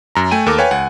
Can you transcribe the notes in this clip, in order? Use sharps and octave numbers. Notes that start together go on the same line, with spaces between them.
F#2 A#5
A3 G5 G#5 D#7
D#2 A4 A#4 D6
B4 C#5 F5 G5 G#5
C#2 F#5 G#5